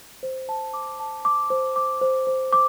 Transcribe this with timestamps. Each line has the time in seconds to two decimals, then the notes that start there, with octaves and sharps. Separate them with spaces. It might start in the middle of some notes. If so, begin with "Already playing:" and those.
0.23 C5
0.49 A5
0.74 D6
1.00 A5
1.25 D6
1.50 C5
1.76 D6
2.01 C5
2.27 C5
2.52 D6